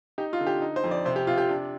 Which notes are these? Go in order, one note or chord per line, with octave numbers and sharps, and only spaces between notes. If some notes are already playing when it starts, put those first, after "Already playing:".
D#4 G4
F4
D3
G4
D#4
C5
F2
D5
C3 C5
G4
C3 F4
G4
D4